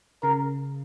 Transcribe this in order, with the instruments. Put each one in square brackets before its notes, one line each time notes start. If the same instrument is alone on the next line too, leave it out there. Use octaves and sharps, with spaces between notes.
[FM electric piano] C#3 [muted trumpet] A#4